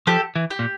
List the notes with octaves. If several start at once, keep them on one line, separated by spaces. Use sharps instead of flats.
F3 G4 A4
E3
G4
A#2